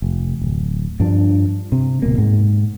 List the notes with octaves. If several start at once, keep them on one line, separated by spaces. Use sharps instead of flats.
F1
D1
G2 F3 D4
C3
D1 B2 A#3
G#2